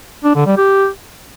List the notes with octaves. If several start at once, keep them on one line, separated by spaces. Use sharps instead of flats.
D4
D3
G3
G4